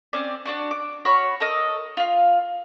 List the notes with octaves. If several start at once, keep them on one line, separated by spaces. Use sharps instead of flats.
C4 C#4 D5
D4 F#4 D5
D6
F#4 C#5 B5 F6
A4 A#4 D#5
F4 F5